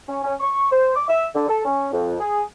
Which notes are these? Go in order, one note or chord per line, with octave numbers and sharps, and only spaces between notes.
C#4
C#4
C#6
C5
D6
E5
D3
A4
C#4
F2
G#4